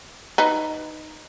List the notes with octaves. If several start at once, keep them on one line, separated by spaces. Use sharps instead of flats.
D#4 B4